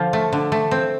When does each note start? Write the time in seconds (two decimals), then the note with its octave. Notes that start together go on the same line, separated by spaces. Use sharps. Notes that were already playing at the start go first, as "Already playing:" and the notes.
Already playing: D3 F3 F4
0.13 A3
0.33 D3
0.52 A3
0.71 C4